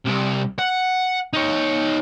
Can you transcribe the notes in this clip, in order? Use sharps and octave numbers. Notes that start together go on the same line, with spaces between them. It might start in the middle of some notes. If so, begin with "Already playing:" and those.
C2 C3
F#5
D#4 C#5